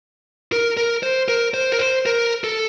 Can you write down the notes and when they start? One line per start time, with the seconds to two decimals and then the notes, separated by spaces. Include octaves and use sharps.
0.52 A#4
0.77 A#4
1.03 C5
1.28 A#4
1.54 C5
1.72 A#4
1.79 C5
2.06 A#4
2.44 A4